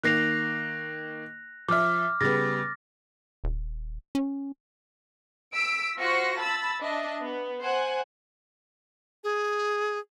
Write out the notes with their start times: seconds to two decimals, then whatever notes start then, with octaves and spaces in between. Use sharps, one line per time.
0.03 D#3 A#3 F#6 A#6 C7 F7
1.68 F3 E5 D6 F6
2.21 C#3 G3 B3 A6 A#6
3.44 D#1
4.15 C#4
5.54 E6 B6 D7
5.96 F4 F#4 C5 A#6 C#7
6.39 A5 B5 E6 A6
6.81 D4 D#5 E5
7.23 B3
7.61 C5 F#5 G#5
9.24 G#4